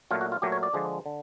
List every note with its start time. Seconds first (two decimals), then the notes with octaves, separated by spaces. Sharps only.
0.11 A#2 F#3 A3 F4
0.21 F#4
0.32 F4
0.42 A#2 F#3 A3 G4
0.52 C#5
0.63 D5
0.73 D3 F3 G#3
1.06 D3